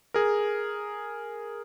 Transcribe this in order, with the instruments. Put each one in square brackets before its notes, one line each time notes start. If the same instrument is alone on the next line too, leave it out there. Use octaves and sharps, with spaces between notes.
[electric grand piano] G#4 A#4